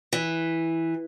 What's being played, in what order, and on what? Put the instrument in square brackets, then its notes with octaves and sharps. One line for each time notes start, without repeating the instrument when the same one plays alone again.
[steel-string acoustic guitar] E3